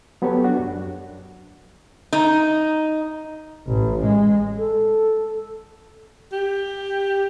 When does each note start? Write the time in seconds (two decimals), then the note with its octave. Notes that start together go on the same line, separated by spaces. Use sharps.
0.22 F#3 B3 G4 A4 C#5
0.44 D4 F#4
0.59 F#2
2.13 D#4
3.67 A1
4.05 G#3
4.58 A4
6.33 G4